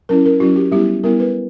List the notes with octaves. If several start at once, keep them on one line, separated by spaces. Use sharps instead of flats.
F#3 C#4 E4 A#4
A#4
F#3 C#4 E4 F#4
G4
G3 B3 E4 G4
G3 B3 E4 A#4
B4